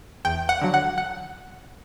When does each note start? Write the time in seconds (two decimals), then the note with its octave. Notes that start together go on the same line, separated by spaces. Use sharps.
0.25 E2 G5
0.49 F#5
0.62 D3 F#3
0.74 F#5
0.98 F#5